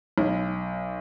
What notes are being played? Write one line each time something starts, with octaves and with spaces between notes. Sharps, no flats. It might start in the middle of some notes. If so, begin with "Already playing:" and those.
B1